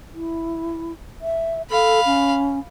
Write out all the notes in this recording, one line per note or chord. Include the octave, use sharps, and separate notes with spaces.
E4
E5
A4 F5 B5
C#4